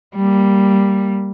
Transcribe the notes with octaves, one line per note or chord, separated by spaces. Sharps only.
G3 A#3